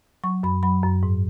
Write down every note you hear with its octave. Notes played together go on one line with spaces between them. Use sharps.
F#3 C#6
F#2 B5
F#3 B5
F#2
G#2